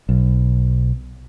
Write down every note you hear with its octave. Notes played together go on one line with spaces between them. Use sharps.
B1